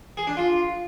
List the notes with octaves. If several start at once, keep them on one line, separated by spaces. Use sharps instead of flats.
G#4
D4
F4